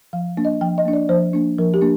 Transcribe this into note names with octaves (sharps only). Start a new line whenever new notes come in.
F3 F5
A#3 D4
D#5
F3 G5
D#5
A#3 D4
D5
F3 C5
A#3 D4
F3 A#4
G4
A#3 D4